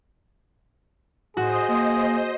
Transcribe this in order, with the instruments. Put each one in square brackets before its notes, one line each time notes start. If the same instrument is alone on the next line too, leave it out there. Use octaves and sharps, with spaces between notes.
[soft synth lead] A2 [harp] F#4 [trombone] G#4 [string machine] C5 D#5
[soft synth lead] A#3